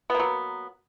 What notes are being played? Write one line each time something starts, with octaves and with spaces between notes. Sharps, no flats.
F#3 A#3 B3